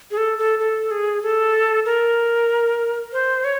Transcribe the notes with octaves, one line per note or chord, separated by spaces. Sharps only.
G#4
A4
A4
A4
G#4
A4
A#4
C5
C#5